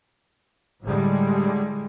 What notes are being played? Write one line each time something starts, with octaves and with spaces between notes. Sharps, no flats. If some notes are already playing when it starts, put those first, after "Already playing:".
A2 D3 G3 G#3